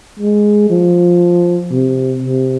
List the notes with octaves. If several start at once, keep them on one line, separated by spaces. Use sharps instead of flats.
G#3
F3
C3
C3